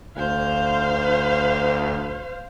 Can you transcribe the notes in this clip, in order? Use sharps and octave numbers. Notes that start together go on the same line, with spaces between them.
D2 C5 F5